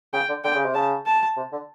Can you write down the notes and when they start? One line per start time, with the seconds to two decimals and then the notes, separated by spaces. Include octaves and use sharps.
0.13 C#3 G5
0.29 D3
0.44 D3 G5
0.55 C#3
0.65 C3
0.74 C#3 A5
1.06 A5
1.37 C3
1.52 D3